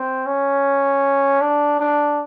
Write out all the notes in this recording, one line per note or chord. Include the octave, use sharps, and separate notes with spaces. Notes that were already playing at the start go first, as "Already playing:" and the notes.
Already playing: C4
C#4
D4
D4